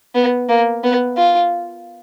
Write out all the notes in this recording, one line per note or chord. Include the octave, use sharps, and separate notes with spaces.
B3
A#3
B3
F4